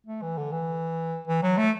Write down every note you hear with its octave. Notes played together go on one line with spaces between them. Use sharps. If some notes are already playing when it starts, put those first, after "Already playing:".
A3
E3
D3
E3
E3
F#3
A3